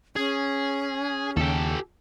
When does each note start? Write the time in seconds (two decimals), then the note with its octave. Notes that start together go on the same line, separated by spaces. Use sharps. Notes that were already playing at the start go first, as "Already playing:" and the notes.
0.16 C#4 G#4
1.36 D#2 C#3 G4 A4